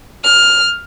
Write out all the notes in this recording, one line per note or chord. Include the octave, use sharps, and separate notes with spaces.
F6